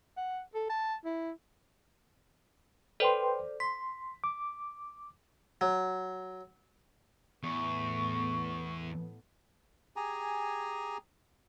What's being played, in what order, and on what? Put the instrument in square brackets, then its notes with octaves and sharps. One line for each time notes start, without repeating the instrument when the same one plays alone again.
[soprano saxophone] F#5
A4
A5
E4
[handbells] A4 C5 D5 [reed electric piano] B4 G5 C6
[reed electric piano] C6 [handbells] B6
[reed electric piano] D6
[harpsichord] F#3
[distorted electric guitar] E2 [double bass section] A2 A3 B3 [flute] C#6
[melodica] G4 G#4 G#5 A#5